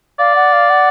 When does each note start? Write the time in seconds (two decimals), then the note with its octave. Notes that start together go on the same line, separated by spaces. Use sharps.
0.19 D5 F5
0.36 F#5
0.53 F5
0.70 F#5